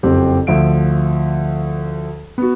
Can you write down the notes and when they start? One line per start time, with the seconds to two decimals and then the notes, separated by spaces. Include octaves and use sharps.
0.03 F#1 F2 C4 G4
0.47 D2 F3 E5 D7
2.38 B3 F#4